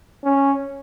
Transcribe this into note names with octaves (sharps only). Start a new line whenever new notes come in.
C#4